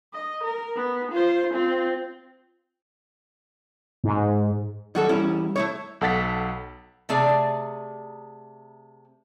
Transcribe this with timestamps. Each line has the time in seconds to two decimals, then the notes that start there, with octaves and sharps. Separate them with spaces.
0.14 D#5
0.44 A#4
0.76 B3
1.12 F4 C5
1.54 C4 F4
4.04 G#2
4.95 D#3 F#3 G3 F#4 A4
5.09 E2 G3 C#4 E4
5.56 A3 E4 C#5
6.01 B1 A4 F#5 A6 B6
7.09 C3 A3 G#4 D5